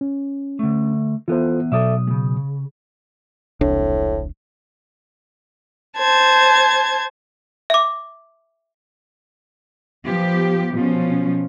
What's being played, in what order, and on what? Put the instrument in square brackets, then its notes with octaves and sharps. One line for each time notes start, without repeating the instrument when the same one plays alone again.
[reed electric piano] C#4
[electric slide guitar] D3 A3
[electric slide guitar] E3 B3 [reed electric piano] F4 A4 C5
[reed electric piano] B2 F#3 D#6 [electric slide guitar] A4 D5 E5
[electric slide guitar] C#3 G#3
[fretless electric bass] E1 C2 D4 [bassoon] A2
[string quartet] C5 A5 G#6
[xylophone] E5 D6
[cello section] F3 B3 G4
B2 F3 C#4